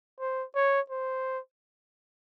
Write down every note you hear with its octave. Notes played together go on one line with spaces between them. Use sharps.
C5
C#5
C5